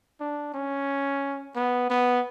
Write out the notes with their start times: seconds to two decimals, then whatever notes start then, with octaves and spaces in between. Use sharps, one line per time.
0.20 D4
0.54 C#4
1.56 B3
1.90 B3